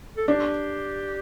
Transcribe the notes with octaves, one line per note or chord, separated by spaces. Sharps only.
A4
D4 G4